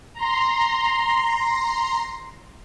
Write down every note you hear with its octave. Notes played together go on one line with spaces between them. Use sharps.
A#5 C6